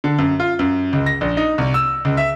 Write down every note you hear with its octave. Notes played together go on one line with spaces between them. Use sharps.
D3
F#2
F4
F#2
C#2
A#6
A#1
D#4
C2
E6
C#2
E5